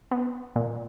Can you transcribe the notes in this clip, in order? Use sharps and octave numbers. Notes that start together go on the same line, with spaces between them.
B3
A#2